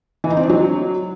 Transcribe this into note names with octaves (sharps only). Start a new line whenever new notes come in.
E3
D#4
C4
D4
F#3